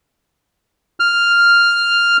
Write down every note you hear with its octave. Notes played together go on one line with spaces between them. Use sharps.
F6